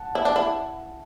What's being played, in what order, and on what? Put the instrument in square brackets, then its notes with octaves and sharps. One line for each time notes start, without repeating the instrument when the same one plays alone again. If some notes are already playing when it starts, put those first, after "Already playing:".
Already playing: [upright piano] F#5 A5
[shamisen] E4
D4
E4